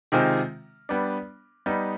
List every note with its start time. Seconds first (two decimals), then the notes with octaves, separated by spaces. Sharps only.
0.12 C3 D#3 G#3 C4 F4
0.89 G3 B3 D4
1.66 G3 B3 D#4